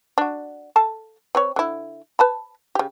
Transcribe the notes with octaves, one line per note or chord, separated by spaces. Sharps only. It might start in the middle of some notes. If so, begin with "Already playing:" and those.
D4 F#4
A4 F5 A5
C4 B4 C#5
D3 E4
B4 A5 B5
C#3 G4